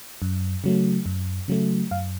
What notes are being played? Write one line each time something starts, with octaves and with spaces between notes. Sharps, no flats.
F#2
C#3 F#3 A3
F#2
C#3 F#3 A3
F#2 F5